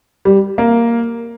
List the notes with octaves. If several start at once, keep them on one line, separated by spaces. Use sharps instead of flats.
G3
A#3